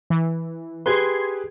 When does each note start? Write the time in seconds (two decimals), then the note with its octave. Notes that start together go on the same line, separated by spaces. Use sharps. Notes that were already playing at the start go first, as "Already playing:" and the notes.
0.10 E3
0.86 G4 G#4 B4 C6 G#6 C7